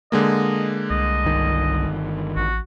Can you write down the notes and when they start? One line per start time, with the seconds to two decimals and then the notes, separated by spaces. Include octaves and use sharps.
0.12 D3 G#3 A#3 D#5
0.90 C2 D#5
1.25 G1 D#3
2.36 A1 F#4